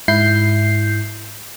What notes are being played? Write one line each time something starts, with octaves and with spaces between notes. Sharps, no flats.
G#2 E4 G6 C7